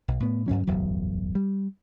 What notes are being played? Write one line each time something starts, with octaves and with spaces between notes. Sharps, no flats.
B1
A2 B3
D2 G2 F#3 C#4
D1 G1 E2 F#3
G3